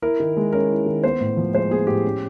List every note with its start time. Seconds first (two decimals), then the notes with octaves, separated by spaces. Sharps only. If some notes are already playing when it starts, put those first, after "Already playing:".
0.02 E4 A#4
0.20 D#3
0.37 G#3
0.53 C#4 A#4
0.70 E4
0.86 D#3
1.03 B3 C5
1.20 A2
1.37 F3
1.53 G#3 C5
1.70 B3 G#4
1.87 A2 G4
2.04 C#4